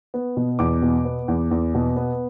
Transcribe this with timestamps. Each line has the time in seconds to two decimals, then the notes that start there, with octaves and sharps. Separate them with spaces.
0.14 B3
0.37 B2
0.59 E2 D6
0.82 B2
1.05 B3
1.28 E2
1.51 E2
1.75 B2
1.97 B3